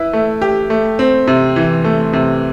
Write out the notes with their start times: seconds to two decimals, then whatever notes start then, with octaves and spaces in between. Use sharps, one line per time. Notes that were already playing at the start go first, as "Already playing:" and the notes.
Already playing: E4 B4
0.13 A3
0.42 G4
0.70 A3
0.99 C4
1.28 C3
1.56 E3
1.84 A3
2.13 C3